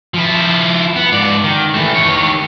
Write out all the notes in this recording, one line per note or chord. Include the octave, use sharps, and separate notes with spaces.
F3 E4
B3
G#2 D5
D#3
E3 A3
D#3 C#5